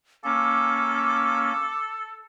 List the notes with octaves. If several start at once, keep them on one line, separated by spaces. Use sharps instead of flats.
A#3 C#4 A4 D6